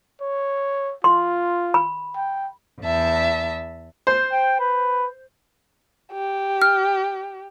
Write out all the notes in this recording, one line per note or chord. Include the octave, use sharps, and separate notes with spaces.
C#5
F4 C6
B5
G5
E2 E5 A5
C5
G5
B4
G4
F6